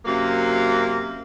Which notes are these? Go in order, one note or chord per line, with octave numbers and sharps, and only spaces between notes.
F#2 C3 A#3